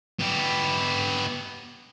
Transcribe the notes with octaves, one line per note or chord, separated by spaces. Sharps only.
B3 G4